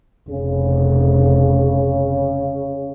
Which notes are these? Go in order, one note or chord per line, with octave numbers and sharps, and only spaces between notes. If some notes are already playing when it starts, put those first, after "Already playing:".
F1 C#3